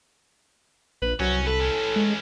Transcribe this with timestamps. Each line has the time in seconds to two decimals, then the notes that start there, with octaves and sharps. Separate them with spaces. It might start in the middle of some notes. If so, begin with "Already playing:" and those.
1.02 A#1 B4
1.20 C2 F#3 C#4
1.47 A4 B4
1.60 E3 C#4
1.96 G#3